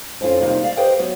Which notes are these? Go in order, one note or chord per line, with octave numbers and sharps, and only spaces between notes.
F2 C#4 E4 F4
C3 D#3 G3 A#3 D#4 F4
D5 F5
G4 B4 C5 D#5 F5 G5
F#3 B3